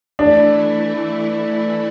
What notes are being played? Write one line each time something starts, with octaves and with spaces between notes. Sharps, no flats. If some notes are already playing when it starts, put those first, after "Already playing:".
E3 A3 D4 E4